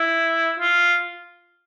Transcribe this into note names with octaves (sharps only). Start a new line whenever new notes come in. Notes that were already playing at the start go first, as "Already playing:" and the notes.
Already playing: E4
F4